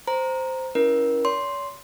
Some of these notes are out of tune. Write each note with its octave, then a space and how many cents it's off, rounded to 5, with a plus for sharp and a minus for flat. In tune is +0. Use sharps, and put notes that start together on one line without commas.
C5 -5 A#5 +0
C#4 +15 E4 +0 A#4 +30
C#5 +40 C6 +0